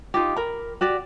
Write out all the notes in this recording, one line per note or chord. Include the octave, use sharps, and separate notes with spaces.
D#4 F4 G4
A#4 B5
F#4 G4 D5